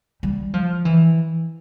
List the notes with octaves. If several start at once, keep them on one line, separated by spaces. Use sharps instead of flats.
G3
F3
E3